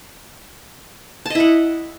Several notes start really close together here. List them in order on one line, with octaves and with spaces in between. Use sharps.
A5 D#5 E4 F#5